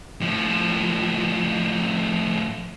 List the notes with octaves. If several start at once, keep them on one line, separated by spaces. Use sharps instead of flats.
A2 F3